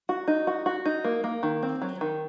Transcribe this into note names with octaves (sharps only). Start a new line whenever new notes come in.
F#4
D#4
F#4
F#4
D#4
A#3
A#3
D#3
C4
F#3
D#3